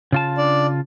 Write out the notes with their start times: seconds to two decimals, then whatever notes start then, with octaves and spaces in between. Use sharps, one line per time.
0.12 C#3 F4 A5
0.38 D4 D5